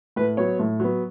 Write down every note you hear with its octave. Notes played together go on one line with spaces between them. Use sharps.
A2 B4
F#3 B3 C#5
A2
F#3 B3